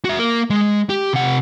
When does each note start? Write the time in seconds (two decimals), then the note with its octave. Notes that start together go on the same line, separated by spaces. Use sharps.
0.05 F#4 E5
0.19 A#3 A#4
0.50 G#3
0.89 G4
1.13 C3 F#5